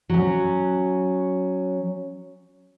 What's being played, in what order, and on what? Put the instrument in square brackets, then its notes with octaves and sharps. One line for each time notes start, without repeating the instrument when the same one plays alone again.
[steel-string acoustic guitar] F#3 C#4